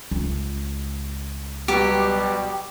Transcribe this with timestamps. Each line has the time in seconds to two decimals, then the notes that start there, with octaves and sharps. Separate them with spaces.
0.11 C#2
1.68 B2 F#3 G3 G4